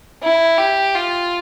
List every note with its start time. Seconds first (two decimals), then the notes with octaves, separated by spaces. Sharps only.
0.22 E4
0.58 G4
0.95 F4